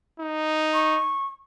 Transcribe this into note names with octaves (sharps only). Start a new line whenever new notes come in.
D#4
C#6